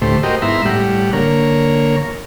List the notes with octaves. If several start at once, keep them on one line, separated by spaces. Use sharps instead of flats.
D2 A2 A3 G4 C5
F#4 G4 A#4 C5 D#5 G5
G#2 B3 E4 E5 A#5 C6
A2 G3 G4 F#5
D3 A#3 A#4 C#5